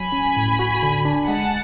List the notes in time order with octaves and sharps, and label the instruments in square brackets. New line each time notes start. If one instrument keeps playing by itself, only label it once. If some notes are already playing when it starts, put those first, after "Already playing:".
Already playing: [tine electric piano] F#3 [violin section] G#5 B5
[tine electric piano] C#4
A2
F#4
D3
D4
[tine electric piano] G#3 [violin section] F#5 A5